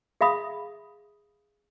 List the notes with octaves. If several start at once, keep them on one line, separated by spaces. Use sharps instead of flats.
G#4 E5 F5 B5 D#6